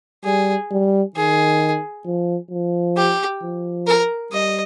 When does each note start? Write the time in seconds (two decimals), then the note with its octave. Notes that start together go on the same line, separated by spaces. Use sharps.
0.24 G3 G#4
0.71 G3
1.16 D#3 G#4
2.06 F3
2.51 F3
2.97 G4
3.42 F3
3.87 A#4
4.32 G3 D#5